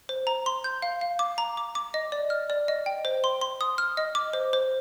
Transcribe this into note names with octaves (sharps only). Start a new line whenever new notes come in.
C5
A#5
C6
G6
F5
F5
D6
A#5
D6
D6
D#5
D5
F6
D5
D#5
G5
C5
C6
C6
D#6
F6
D#5
D6
C5
C5